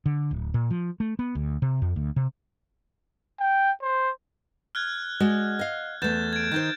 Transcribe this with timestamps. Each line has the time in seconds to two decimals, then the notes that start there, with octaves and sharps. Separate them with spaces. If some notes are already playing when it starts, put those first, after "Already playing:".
0.06 D3
0.31 D1
0.54 A#2
0.71 F3
1.00 A3
1.19 B3
1.35 D2
1.62 C3
1.82 F2
1.96 D2
2.16 C3
3.40 G5
3.82 C5
4.75 F6 F#6 G#6
5.20 G#3 F#4 D5
5.59 D#5 F5
6.02 E2 A3 G6 A6 E7
6.33 G#6 D7
6.52 D#3 D#4 C5 G6